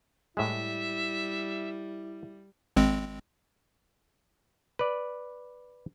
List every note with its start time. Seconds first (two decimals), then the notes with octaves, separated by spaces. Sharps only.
0.37 A2 G3 G#3 E4 E5
2.76 G#1 G#3 C4
4.79 B4 D5